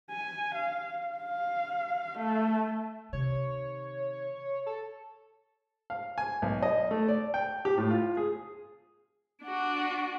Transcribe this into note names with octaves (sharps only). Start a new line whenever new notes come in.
G#5
F5
F5
A3
C3 D#3 C#5
A4
F5
G#5
B1
D#5
A3
D5
G5
G4
A2
F4
G#4
D4 F#4